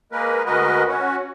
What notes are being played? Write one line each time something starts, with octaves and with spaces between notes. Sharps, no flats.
G#3 A#3 A#4 B4
D2 G#3 F#4 A#4 B4 D#5
C#4 F#4